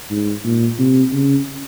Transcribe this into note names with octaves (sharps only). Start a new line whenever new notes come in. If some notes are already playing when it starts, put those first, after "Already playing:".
G#2
A#2
C3
C#3